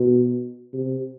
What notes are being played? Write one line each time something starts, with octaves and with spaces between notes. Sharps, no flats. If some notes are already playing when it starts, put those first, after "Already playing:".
Already playing: B2
C3